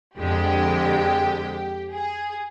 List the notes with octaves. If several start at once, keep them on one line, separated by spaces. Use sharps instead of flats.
F2 D3 G#3 G4
G#4